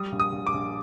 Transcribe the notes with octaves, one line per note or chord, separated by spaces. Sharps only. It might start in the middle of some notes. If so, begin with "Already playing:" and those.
Already playing: G3 D#6
A#1
D#6
A#1
D6
A#1